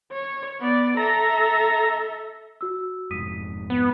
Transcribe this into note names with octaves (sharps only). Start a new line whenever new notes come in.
C#5
B3 D5
A4 E5 A#5
F#4 E6
F1 F2 G#2 D#6 B6 D#7
B3